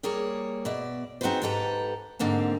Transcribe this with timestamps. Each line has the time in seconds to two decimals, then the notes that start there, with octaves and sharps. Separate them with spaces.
0.03 G3 A#3 G#4 A#4 C#5
0.65 B2 D5 E5
1.21 C4 D#4 F#4 G#4 B4 C5
1.42 G#2 G4 A4 B4 A#5
2.19 G#2 D3 A#3 C4 A5